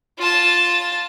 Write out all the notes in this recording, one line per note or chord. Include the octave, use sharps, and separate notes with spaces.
F4 A5